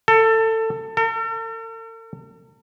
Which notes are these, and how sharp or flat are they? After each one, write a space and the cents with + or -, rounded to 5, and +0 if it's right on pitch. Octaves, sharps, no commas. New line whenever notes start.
A4 +20
A4 +45